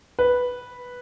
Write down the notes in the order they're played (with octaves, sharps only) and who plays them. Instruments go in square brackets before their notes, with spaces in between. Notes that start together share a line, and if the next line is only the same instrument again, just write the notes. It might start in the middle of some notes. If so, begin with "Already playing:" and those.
[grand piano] B4